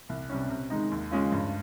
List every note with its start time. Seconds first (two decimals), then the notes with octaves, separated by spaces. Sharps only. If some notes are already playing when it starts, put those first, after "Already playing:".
0.09 C2
0.29 C3 G3 C#4
0.50 C3
0.70 D#3 G#3 D#4
0.91 D#2
1.11 C#3 G#3 C#4 F4
1.32 G2